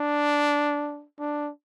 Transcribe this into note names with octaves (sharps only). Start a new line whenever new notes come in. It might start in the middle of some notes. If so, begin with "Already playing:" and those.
Already playing: D4
D4